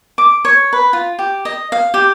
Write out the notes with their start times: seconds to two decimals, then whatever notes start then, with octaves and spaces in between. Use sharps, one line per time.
0.18 D6
0.45 C#5
0.73 B4
0.93 F4
1.19 G4
1.45 D#5
1.72 F5
1.94 G4